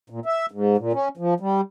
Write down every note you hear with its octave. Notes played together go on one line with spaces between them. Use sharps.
A#2
E5
G#2
A#2
C#4
F3
G3